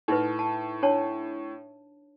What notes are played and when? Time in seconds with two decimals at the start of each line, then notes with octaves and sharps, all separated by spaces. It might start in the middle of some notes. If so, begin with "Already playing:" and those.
0.08 A2 D#4 E4 B4
0.39 A5
0.83 D4 C#5 A5